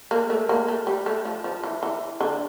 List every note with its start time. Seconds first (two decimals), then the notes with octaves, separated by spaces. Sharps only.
0.11 A#3
0.30 A3
0.49 A#3
0.68 A3
0.87 G3
1.06 A3
1.25 F3
1.44 F3
1.63 E3
1.83 E3
2.20 D3